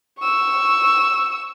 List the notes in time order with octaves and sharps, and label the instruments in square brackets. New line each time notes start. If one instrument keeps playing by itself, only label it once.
[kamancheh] C#6 E6